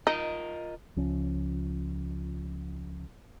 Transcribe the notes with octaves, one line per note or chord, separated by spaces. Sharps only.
D#4 F4 A#4 D#5
C#2 F3 C#4